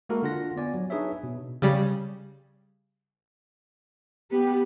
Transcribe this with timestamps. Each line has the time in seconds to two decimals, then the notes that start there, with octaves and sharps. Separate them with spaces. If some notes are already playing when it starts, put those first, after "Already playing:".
0.09 G#3 A#3 E4 F#4 A4 A#4
0.23 D3 D4 F4 F#5 A#6
0.56 B3 D5 G#5
0.74 F#3
0.90 D4 D#4 G#4 B4 C#5 E5
1.23 B2
1.62 C#3 G3
4.31 B3 G4